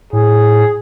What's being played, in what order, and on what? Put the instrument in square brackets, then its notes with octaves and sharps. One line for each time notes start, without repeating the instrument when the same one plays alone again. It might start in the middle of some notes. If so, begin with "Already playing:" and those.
[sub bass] A2 [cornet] G#4